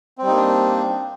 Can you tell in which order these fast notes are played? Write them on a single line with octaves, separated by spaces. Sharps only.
C4 G3 D#4 A#3 D4